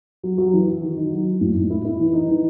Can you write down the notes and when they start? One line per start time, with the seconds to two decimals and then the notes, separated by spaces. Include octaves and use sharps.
0.23 F#3
0.38 F#3
0.53 E3
0.68 E3
0.83 D#3
0.97 D#4
1.11 F#3
1.26 F#3
1.41 A2
1.55 A2
1.70 E4
1.85 E4
1.99 E3
2.14 D#4
2.28 E3